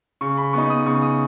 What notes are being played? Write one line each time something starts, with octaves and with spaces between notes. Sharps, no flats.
C#3 C#6
B5
B3 D#4 C#6
D#6
C#3 C#6
D#6